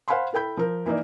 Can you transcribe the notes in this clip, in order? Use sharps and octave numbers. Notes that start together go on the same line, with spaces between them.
C5 F5 F#5 G#5 B5 C6
E4 A4 G5 B5 G6
F3 A#4
E3 A#3 D#4 A#4 D5